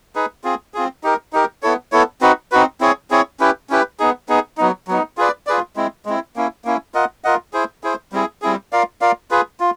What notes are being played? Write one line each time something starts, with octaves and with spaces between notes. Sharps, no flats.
D#4 G#4 B4
C4 F4 G#4
C4 F4 G#4
D#4 G4 A#4
D#4 G4 A#4
B3 E4 A4 C#5
B3 E4 A4 C#5
C4 D#4 F#4 B4
C4 D#4 F#4 B4
C4 E4 G#4 C#5
C4 E4 G#4 C#5
C#4 E4 G4 B4
C#4 E4 G4 B4
B3 D#4 G#4
B3 D#4 G#4
F#3 B3 D#4
F#3 B3 D#4
F4 G#4 B4 D5
F4 G#4 B4 D5
G#3 C4 E4
G#3 C4 E4
A#3 C#4 E4
A#3 C#4 E4
F4 A#4 D#5 F#5
F4 A#4 D#5 F#5
E4 G#4 C5
E4 G#4 C5
G3 C4 E4 G#4
G3 C4 E4 G#4
F4 A#4 D5 F5
F4 A#4 D5 F5
F4 G#4 B4
F4